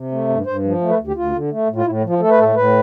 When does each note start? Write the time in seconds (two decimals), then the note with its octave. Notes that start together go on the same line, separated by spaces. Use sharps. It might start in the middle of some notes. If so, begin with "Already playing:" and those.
Already playing: C3
0.12 A3
0.29 G2
0.46 G2 C5
0.64 F3
0.81 A3
0.90 B4
0.98 D2
1.07 G4
1.16 D2 F4
1.33 D3
1.51 A3
1.68 A2
1.76 F4
1.86 A2 E4
2.04 F3
2.09 F4
2.20 A3 A4
2.30 B4
2.38 A2 A4
2.55 A2 B4